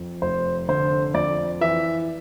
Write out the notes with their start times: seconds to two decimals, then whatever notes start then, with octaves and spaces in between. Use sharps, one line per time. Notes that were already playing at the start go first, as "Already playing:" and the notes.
Already playing: F2
0.22 F1 C5
0.68 D3 C5
1.14 F2 D5
1.61 E3 E5